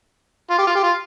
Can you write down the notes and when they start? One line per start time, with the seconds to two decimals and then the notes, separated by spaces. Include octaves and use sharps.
0.50 F4
0.58 G4
0.67 F4
0.75 G4
0.83 F4